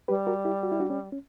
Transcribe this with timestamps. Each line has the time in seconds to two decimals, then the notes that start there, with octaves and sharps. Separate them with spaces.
0.08 G3 G4 B4
0.27 F#4 A#4
0.45 E4 G4
0.63 F#4
0.72 E4
0.80 D4 F#4
0.90 C#4
1.12 C#4